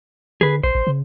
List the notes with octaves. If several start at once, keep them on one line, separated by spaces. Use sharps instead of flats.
D3 G#4 B4
A#1 C5
A1
C#3